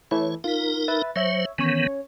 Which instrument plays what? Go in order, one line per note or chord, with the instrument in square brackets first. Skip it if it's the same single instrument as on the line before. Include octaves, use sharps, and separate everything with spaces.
[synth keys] E3 A3 E4 [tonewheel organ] C#5
[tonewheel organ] D#4 A#4 [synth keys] F4 B6
[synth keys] B4 E5 A6
[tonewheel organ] F#3 C5 [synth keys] C#5 E5
[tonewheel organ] D#3 E3 B3 [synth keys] C#4 C#5